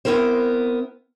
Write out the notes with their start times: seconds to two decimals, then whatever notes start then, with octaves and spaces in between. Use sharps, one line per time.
0.05 B3 C4 E4 A#4 C5